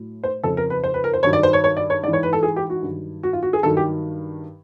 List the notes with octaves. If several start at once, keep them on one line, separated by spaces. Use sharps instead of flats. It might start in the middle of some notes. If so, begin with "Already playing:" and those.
Already playing: A2 F#3
C5
F2 C#3 F3 A4
A#4
B4
C5
B4
A#4
C5
G2 D#3 F#3 C#5
D5
C5
C#5
C#5
D5
C#5
G#2 E3 D5
C#5
B4
A4
G#4
G4
F#4
G2 D#3 F#3
F#4
F4
F#4
G#4
G2 D#3 F#3 A4
G4